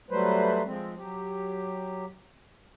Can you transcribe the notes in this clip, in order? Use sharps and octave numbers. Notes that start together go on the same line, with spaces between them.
F#3 G3 A3 B4 C5
F3 G#3 C4
F#3 G4